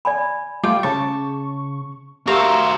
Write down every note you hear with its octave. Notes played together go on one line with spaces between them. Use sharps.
D5 G#5 B5
G3 A3 F4 G5 D6
C#3 A5 C#6
F#4 G4 A#4 C5 E5 F5 A#5 E6